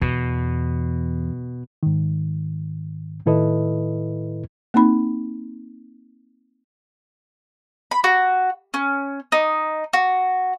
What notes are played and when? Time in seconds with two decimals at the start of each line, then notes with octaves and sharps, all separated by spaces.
0.01 E2 B2
1.83 G#2 D#3
3.26 A2 D#3 E4 A4 B4 D#5
4.74 A#3 C4 D#4 B5
7.91 B5
8.04 F#4
8.74 C#4
9.32 D#4
9.93 F#4